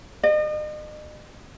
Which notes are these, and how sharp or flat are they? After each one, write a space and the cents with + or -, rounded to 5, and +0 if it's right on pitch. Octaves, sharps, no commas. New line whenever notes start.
D#5 -40